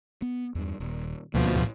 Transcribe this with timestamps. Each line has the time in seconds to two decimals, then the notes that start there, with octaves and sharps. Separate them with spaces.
0.22 B3
0.55 E2 G2
0.80 D#1
1.34 D2 B2 F3 A#3
1.55 A1 A2